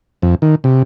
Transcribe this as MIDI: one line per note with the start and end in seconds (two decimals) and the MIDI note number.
0.22 0.35 41
0.42 0.55 51
0.64 0.83 48